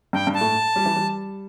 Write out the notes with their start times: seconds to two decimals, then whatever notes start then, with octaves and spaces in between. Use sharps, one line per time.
0.13 G2 G5
0.27 G2
0.34 A5
0.41 A2
0.76 G3
0.85 E3
0.96 G3